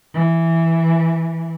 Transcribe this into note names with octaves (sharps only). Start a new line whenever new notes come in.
E3